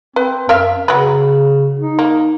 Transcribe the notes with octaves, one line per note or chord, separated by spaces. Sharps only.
C4 B4
F#2 A#4 E5 F5
C#3 F#3 B4
D#4
A#3